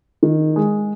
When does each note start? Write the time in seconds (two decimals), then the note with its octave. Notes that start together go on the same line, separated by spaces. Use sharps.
0.23 D#3
0.56 G#3